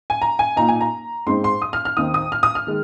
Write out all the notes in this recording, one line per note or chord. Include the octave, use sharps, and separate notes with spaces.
G#5
A#5
G#5
A#2 A#3 D#4 A#5
G#5
A#5
G#2 G#3 C4 D#4 C6
C6
D#6
F6
F6
D#2 D#3 C4 D#4 D#6
D#6
F6
D#6
F6
D#3 G#3